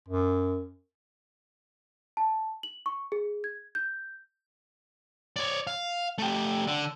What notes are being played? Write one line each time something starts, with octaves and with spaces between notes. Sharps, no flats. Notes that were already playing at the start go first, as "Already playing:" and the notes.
F#2
A5
F#7
C#6
G#4
G#6
G6
C#5 D5
F5
A3 G4
D3